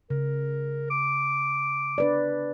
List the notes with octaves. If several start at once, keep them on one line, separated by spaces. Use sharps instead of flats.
C#3 A#4
D6
D4 B4 D5